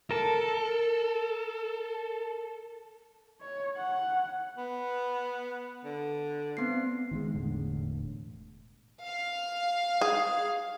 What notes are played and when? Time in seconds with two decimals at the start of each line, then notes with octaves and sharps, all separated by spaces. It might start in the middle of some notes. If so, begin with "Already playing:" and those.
0.11 A4 A#4 A5
3.41 C#5
3.77 F#5
4.58 B3
5.85 D3
6.57 B3 C4 C7
7.11 D#3 E3 G#3
7.34 E1 A2 D3
9.02 F5
10.01 G#4